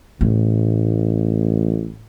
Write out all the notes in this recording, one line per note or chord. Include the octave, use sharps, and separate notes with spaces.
A1 A2